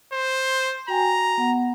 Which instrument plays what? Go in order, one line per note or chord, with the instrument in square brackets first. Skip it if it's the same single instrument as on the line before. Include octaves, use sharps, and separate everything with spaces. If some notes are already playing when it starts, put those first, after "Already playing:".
[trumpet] C5
[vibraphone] F#4 G5 G#5 [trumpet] A#5
[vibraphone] B3 F#5